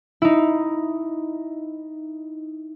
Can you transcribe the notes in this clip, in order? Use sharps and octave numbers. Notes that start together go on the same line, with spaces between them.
D#4 E4